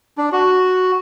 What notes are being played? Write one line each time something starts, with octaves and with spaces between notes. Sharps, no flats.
D4
F#4